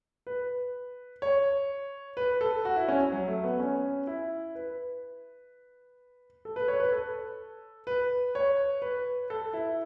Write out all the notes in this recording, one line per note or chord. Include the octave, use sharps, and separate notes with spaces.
B4
C#5
B4
A4
F#4
E4
C#4
F#3
A3
B3
C#4
E4
B4
A4
B4
C#5
B4
A4
B4
C#5
B4
A4
E4